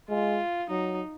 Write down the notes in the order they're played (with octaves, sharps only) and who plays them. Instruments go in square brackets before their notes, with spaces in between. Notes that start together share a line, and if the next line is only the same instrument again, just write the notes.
[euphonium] G#3 [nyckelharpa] F4
[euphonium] F#3 [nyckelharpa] D#4